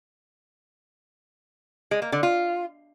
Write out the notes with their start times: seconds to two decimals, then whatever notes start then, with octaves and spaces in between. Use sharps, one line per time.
1.91 G#3
2.02 A#3
2.12 D3
2.23 F4